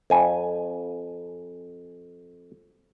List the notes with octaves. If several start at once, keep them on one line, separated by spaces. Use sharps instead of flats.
F2 G#5